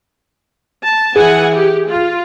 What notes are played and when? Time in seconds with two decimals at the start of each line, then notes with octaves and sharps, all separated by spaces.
0.84 A5
1.16 E3 G#4 F#5 G#5
1.54 G4
1.88 F4